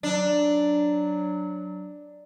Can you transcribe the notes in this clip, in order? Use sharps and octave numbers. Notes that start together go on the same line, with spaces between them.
F#3 D4